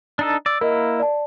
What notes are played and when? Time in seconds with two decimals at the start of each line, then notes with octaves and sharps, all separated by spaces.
0.19 D4 D#4 A4
0.46 D5 E6
0.61 A#3 E4 A#4 D#5
1.00 D5 A5